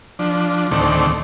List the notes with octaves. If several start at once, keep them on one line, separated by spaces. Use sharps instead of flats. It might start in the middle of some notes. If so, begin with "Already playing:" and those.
F3 D4
D2 A2 D#3 A3 C4 D5